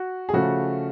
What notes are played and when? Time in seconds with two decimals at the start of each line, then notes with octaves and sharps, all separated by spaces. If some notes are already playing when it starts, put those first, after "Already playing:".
Already playing: F#4
0.29 G#4
0.33 C#3 F3 A3 F#4